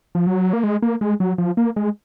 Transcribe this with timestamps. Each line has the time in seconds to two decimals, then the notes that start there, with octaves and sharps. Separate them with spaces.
0.15 F3
0.27 F#3
0.53 A#3
0.63 G#3
0.82 A#3
1.01 G#3
1.20 F#3
1.38 F3
1.57 A#3
1.76 G#3